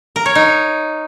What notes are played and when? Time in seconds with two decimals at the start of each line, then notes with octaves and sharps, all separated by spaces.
0.16 A#4
0.26 C#5
0.35 D#4